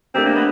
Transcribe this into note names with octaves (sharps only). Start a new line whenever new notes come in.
A3 C4 D4 G4 A#4
A#3
B3